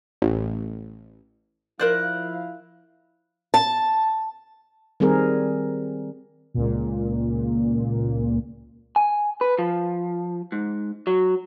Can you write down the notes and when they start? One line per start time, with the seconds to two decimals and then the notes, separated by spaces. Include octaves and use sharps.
0.22 A1
1.79 F3 E4 A#4 C5 D5 F5 F#6
3.54 A5
5.00 D#3 G3 C4 G#4 A#4
6.54 C#2 A#2
8.96 G#5
9.41 B4
9.59 F3
10.52 G#2
11.07 F#3